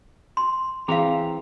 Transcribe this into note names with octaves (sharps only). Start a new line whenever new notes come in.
C6
E3 C4 G#4 F5 A#5